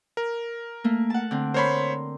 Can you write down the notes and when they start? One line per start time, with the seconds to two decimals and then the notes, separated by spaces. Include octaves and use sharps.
0.17 A#4
0.84 A3 A#3
1.10 F#5 A5
1.31 D3 C4
1.54 A#4 C5 C#5 B5 C6